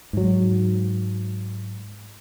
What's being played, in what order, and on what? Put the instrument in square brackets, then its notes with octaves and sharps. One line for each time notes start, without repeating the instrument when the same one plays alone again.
[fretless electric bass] G#2 F#3